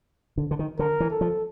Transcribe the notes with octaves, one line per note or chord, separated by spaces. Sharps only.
D3
D3
D#3
D3 A#4
E3
A4
F3